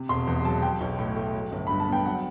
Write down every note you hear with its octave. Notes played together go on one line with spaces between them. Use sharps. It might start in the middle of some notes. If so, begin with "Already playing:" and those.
Already playing: C3
E1 C6
E2
F#3 A5
F#3 G5
B1
A2
A3
F#3
G1
G2 B5
A5
B3 G5
F#3 F#5